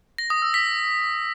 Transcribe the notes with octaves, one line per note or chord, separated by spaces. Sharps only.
A#6
D#6
E6
B6